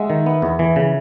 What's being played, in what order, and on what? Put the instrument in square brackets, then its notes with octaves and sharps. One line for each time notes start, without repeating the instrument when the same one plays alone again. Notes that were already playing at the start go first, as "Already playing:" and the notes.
Already playing: [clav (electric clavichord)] G#3 [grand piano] E5 F#5
[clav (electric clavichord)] D#3
B3
E2
E3
C#3